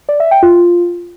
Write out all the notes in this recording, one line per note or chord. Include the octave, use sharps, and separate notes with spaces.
D5
E5
G5
F4